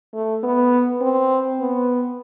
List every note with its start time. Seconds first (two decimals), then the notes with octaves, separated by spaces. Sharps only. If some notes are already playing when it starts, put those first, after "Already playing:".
0.14 A3
0.43 B3
1.01 C4
1.60 B3